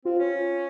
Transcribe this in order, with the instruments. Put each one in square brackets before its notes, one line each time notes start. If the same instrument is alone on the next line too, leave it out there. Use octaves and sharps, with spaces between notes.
[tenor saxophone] C4 [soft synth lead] F4
[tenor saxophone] C#4